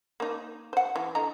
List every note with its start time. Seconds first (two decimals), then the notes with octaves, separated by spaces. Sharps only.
0.20 A#3 D#4
0.73 C5 F#5
0.96 E3
1.15 D3 D#5 A#5